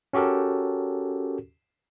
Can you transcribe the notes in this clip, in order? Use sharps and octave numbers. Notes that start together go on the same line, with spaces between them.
C#4 F#4 G4 A4 A#4